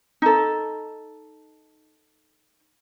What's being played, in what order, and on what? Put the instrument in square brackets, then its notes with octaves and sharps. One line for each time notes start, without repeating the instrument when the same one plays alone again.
[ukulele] D#4 A4